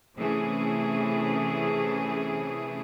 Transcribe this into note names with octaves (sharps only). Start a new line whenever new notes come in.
C3 E3 A3 C#4 G#4